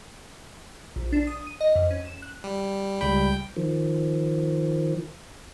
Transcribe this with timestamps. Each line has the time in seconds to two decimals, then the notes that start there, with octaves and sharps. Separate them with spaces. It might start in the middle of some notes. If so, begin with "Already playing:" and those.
0.96 A#1
1.12 D4
1.27 D#6
1.47 D#7
1.61 D#5
1.75 F2
1.91 C#4
2.05 E7
2.22 F#6
2.44 G3
3.01 C#2 G3 G5 B5
3.56 D#3 F3